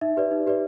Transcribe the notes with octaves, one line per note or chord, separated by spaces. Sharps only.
D#4 E5
G4 B4 D5
D#4
G4 B4 D5